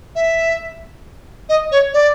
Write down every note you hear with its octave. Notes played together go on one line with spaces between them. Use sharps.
E5
D#5
C#5
D5